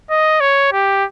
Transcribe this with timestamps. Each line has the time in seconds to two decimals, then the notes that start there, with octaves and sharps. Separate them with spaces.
0.10 D#5
0.41 C#5
0.72 G4